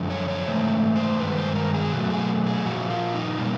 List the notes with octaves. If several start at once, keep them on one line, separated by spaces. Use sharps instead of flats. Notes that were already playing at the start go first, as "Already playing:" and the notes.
Already playing: F#2 D3 F3
C#5
C#5
G#2 E3 A3 C5
C5
G2 D#3 G#3 B4
C5
A#4
G#4
B2 F#3 A3 F#4
G#4
G#4
A#2 F3 A#3 F#4
F4
D#4
B2 G3 A#3